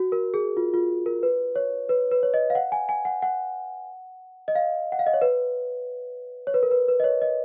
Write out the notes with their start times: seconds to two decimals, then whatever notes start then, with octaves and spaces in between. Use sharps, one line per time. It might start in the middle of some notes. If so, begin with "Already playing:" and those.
Already playing: F#4
0.12 A#4
0.34 G#4
0.57 F4
0.74 F4
1.06 A#4
1.23 B4
1.56 C#5
1.89 B4
2.11 B4
2.23 C#5
2.34 D#5
2.50 F5
2.55 F#5
2.72 G#5
2.89 G#5
3.05 F#5
3.22 F#5
4.48 D#5
4.55 F5
4.92 F#5
4.99 F5
5.07 D#5
5.14 C#5
5.22 B4
6.47 C#5
6.54 B4
6.63 A#4
6.71 B4
6.88 B4
7.00 D#5
7.04 C#5
7.22 D#5